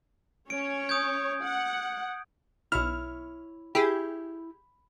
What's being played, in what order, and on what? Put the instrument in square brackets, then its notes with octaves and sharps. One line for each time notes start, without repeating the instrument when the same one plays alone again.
[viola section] C#4 C#5 [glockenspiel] D7
[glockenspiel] D#6 G6 G#6
[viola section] F#5
[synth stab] B1 F6 [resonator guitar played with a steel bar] E4 C#5
[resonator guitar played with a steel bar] E4 [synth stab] G4 G#4